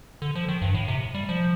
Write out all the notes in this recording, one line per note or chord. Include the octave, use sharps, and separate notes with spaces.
D3
F3
D#3
G2
A2
C3
G3
F3